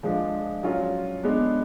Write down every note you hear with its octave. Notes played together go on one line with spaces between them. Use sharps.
F3 G#3 D4
F#3 C#4 F4
G#3 B3 D4